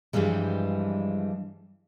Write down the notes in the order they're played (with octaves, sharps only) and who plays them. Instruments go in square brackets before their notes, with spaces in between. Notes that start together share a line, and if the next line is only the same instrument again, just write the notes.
[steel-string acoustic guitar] G2 E3 F3 G3 G#3